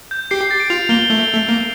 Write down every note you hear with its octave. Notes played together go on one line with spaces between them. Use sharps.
G6
G4 C7
A6
D7
F4 F7
A#3 G7
A3
A3
A#3